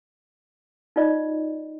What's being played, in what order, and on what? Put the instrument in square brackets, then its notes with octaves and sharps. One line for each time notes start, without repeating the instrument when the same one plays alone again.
[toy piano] D#4 F4 D5 D#5